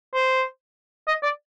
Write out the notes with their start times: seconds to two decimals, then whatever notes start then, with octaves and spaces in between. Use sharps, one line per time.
0.14 C5
1.08 D#5
1.23 D5